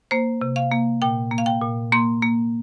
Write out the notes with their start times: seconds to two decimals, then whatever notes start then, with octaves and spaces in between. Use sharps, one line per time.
0.11 A#3 C5
0.41 C3
0.56 F5
0.72 A#3
1.02 A#2 G5
1.31 A#3
1.38 F5
1.46 G5
1.62 A#2
1.92 A#3 C6
2.22 A#3